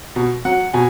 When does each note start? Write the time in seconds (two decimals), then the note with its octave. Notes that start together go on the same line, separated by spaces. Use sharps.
0.16 B2
0.45 F#3 F#5
0.74 B2 G#5